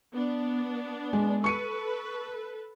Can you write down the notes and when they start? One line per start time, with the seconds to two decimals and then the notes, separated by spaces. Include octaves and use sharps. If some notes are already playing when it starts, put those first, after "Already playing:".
0.14 B3 D4
1.13 G#3
1.44 A4 B4 C#6 C#7 D#7